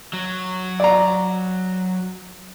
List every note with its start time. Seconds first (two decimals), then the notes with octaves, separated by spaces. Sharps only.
0.13 F#3
0.80 D5 A#5